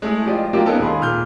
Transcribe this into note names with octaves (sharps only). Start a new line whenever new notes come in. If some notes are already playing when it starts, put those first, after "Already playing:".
G#3 A3 E4 G#4
F3 F4 G4 D5 D#5
F#3 A3 A#3 D4 F4 G4
G#3 B3 C#4 D#4 A4 A#4
D#2 G#4 F5 B5 C6
A#2 F6 G6